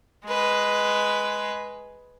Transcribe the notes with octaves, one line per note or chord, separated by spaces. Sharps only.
G#3 B4